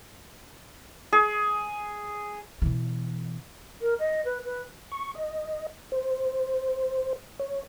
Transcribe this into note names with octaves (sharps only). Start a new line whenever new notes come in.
G#4
B2 E3
A#4
D#5
B4
B4
C#6
D#5
C5
C#5